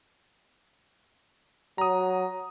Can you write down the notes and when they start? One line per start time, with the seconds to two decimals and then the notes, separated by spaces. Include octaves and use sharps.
1.78 F#3 A#5 D#6